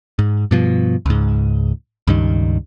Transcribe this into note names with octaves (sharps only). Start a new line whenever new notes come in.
G#2
G2 B2 F3
C#2 G#2
C#2 G2 D#3